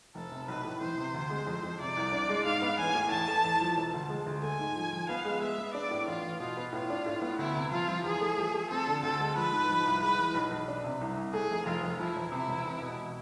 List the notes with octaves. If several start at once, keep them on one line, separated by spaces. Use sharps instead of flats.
F1 A4
C3
B1 B4
A2
E3 C5
C3
D2
G#3
F2
F2
C3 D5
C2
D4
G#3
G#2 F5
B3
A1 G#5
A2
E2 A5
A3
E2
F3
E1
D2
G#3
D2
A3 G#5
G#2
F3
F3
B3 F5
G#3
B3 E5
B3
D4 D5
A2
A1 F4
A1
B2 F4
B3
A2 F4
D4
A2
B3
D2 E4
C3
F3 F4
F3
E2 G#4
A3
F3
A3
C4 A4
D3
D2 A4
G#3
F3 B4
G#2
F3
C2
G#3 B4
E3
B1
B1
D4
C3
C2
C2
A3 G#4
F1
F1 F4
F1
F3 E4
E1
C3 E4
E1
E1
B2